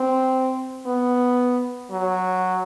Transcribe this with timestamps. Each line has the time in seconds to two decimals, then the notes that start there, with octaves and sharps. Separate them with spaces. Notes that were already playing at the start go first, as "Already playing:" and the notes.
Already playing: C4
0.86 B3
1.91 F#3